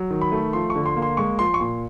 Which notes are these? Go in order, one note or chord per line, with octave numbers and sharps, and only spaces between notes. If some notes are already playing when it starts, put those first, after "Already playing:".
Already playing: F#3
D#3
B5
A3
F3 C6
C#6
D3
C6
A#3
C6
G#3 C#6
F3 C6
C#6
A#2 C6